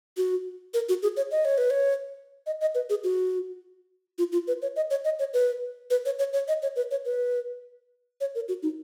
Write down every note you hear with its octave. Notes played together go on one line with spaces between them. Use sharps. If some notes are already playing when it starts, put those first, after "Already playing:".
F#4
A#4
F#4
G#4
C#5
D#5
C#5
B4
C#5
D#5
D#5
B4
G#4
F#4
F4
F4
B4
C#5
D#5
C#5
D#5
C#5
B4
B4
C#5
C#5
C#5
D#5
C#5
B4
C#5
B4
C#5
A#4
F#4
D#4